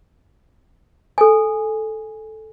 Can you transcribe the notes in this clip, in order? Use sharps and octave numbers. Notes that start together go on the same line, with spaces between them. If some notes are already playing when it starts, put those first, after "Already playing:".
A4 G#5